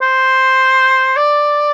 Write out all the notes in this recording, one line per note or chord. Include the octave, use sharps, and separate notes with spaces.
C5
D5